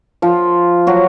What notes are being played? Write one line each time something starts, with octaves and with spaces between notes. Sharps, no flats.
F3 F4
F#3 F#4